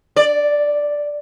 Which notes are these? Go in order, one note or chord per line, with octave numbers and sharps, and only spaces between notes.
D5